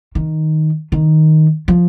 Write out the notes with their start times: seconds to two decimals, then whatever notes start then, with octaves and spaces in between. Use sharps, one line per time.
0.15 D#3
0.92 D#3
1.68 F3